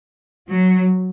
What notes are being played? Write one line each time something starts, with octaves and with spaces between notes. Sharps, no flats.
F#3